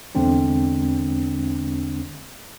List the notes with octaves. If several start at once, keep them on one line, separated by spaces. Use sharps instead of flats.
E2 D3 G#3 C4 D4